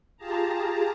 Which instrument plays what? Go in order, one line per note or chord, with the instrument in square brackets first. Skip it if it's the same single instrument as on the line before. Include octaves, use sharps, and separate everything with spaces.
[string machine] F4 G4 G#4 A5 A#5